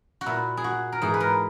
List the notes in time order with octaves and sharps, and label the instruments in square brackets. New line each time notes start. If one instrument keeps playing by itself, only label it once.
[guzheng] F#4
A#2 E4
G#4
F#4
A#4
G#2 E3 G#4
B4
A#4